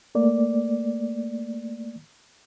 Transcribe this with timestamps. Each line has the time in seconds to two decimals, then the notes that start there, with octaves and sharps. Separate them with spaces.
0.15 A3 A#3 D5